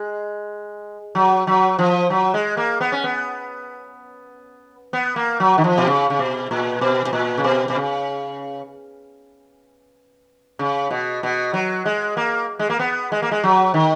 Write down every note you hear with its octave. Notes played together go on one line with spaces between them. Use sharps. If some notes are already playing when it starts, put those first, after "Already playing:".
Already playing: G#3
F#3
F#3
F3
F#3
G#3
A#3
B3
C#4
B3
B3
A#3
F#3
D#3
F3
B2
C#3
C#3
B2
A#2
B2
B2
A#2
C#3
B2
B2
C#3
C#3
B2
B2
F#3
G#3
A#3
G#3
A#3
B3
G#3
A#3
G#3
F#3
D#3